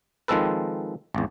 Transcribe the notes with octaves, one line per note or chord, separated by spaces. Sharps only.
D#3 F3 G#3 C4 A4 B4
G#1 E2